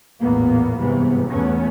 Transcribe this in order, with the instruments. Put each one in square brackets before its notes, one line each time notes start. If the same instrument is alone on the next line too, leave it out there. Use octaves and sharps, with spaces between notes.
[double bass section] A1 E2 A#2 A#3 B3
G1 G#2 C3 E3 B3
E2 G#2 A3 B3 C#4